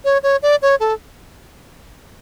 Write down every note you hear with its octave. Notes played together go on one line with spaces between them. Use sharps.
C#5
C#5
D5
C#5
A4